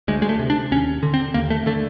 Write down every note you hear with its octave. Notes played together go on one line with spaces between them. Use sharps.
D2 G#3
G#3
A3
C3
D4
D#2 C#4
D3
C4
D#2 A#3
A3
D3 A3